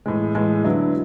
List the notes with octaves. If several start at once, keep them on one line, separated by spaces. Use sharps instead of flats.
A2 E3 G#3
A2 E3 G#3
D3 F#3 B3 E4